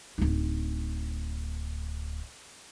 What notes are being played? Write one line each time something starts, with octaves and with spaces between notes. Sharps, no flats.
D1 D#4